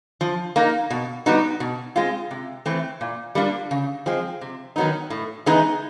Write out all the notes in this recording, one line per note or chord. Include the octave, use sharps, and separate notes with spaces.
F3
A#3 D#4
B2
G3 B3 D#4 F#4
B2
G#3 C4 F4
C3
E3 A3 C4
A#2
G3 A#3 D4 F4
C#3
F3 G#3 C4
C3
D#3 F#3 B3 D#4
A2
E3 G#3 B3 D#4